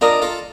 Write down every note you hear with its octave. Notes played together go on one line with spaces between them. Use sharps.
D4 F4 A#4 D#5 A#5
F4 A4